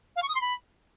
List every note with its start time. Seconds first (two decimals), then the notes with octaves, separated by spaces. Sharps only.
0.16 F5
0.22 C#6
0.29 D#6
0.35 C6
0.41 B5